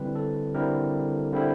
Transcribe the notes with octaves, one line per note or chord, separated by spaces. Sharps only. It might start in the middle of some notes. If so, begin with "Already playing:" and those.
Already playing: D3 G3 C4 E4 B4
A4
D3 G3 C4 E4 A#4
D3 G3 C4 E4